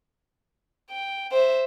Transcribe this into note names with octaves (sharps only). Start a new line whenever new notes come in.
G5
C5 E5